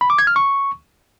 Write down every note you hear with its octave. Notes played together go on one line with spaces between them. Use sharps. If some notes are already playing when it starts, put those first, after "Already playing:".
B5
D6
G#6
F6
C#6